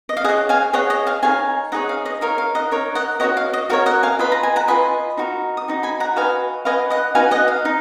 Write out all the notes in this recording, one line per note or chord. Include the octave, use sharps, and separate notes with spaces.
D#5
F5
G#4 C#5 D#5 F#5
F5 G#5
G#4 C#5 D#5 F#5
D#5 F#5
F5 G#5
D#4 G#4 C#5 F5 G#5
D#4 G#4 C#5 D#5 F#5
F5
D#5
D#4 A#4 C#5 F5
F5
D#5 F#5
D#4 A#4 C#5
D#5 F#5
F#4 A#4 C#5 D#5 F#5
F5
D#5
F#4 A#4 C#5 F5
D#5 F#5
F5 G#5
F4 B4 D#5 B5
A#5
G#5
F#5 A#5
F4 B4 D#5 G#5 B5
D#4 F#4 A#4
D#6
D#4 F#4
G#5 B5
F#5 A#5
F#4 B4 D#5 F5 G#5
F#4 B4 D#5 F5 G#5
D#5 F#5
D#4 F#4 B4 F5 G#5
D#5 F#5
F5
D#4